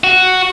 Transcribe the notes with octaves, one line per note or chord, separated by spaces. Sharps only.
F#4